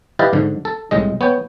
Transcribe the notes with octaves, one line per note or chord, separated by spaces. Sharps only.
E4 G4 B4 D5 D#5 F5
G#2 D3
A4
C2 A2 G#3 D#5
B3 C#5 G5